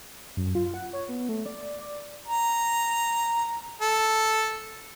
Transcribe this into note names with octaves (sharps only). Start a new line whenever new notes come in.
F#2
F4
F#5
C#5
B3
A3
D5
D5
A#5
A4